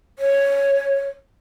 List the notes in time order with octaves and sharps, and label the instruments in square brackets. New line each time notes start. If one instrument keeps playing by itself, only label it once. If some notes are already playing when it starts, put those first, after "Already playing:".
[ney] C#5